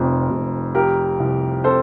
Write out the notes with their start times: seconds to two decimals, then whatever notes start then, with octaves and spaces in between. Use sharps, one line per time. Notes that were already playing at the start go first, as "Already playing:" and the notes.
Already playing: F1 F2
0.30 F1
0.75 F3 G4 A#4
1.20 C2
1.64 C3 A4 C5